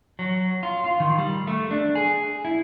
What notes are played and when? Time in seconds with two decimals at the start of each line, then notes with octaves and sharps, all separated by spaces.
0.19 F#3
0.63 F4
0.84 F4
1.00 D#3
1.18 G3
1.47 A3
1.71 D4
1.95 G#4
2.45 E4